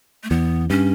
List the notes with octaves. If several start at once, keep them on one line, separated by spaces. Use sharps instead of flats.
A3
E2 B3
G2 C#4